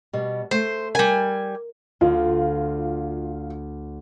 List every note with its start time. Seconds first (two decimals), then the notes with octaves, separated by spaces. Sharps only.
0.13 B2 G3
0.51 A3 C5
0.95 G3 A#4 G#5
2.01 D2 F4